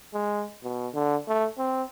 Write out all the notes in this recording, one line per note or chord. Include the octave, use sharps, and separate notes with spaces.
G#3
B2
D3
A3
C4